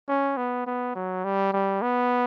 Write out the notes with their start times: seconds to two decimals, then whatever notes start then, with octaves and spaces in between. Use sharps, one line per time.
0.08 C#4
0.37 B3
0.67 B3
0.95 F#3
1.24 G3
1.53 G3
1.82 B3